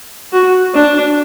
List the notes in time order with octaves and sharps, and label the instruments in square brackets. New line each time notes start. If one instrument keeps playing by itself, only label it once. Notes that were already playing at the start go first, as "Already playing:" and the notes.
[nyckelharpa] F#4
D4